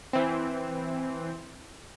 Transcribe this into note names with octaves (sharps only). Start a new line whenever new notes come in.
E3 C4